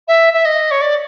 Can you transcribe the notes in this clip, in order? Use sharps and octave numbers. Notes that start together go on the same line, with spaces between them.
E5
E5
D#5
C#5
D5